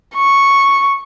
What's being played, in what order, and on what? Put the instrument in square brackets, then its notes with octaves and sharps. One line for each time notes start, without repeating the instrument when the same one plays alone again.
[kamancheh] C#6